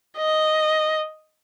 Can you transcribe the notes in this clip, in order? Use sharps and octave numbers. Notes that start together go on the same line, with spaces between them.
D#5